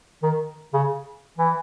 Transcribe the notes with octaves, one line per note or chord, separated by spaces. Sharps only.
D#3
C#3
E3